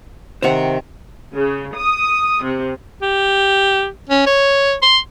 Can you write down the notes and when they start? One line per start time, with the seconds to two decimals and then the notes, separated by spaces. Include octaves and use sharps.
0.42 C3 D#3 C5 F#5 A#5
1.35 C#3
1.76 D#6
2.43 C3
3.02 G4
4.09 C#4
4.26 C#5
4.82 C6